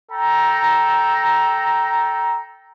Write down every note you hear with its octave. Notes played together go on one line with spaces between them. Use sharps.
A4 G5 A#5